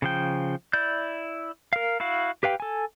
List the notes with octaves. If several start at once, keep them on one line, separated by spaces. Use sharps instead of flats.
C#3 F3 G5
E4 D5 G6
A#4 F5
E4 F#4 F5
G4 B4 F5 G5
A4 G#5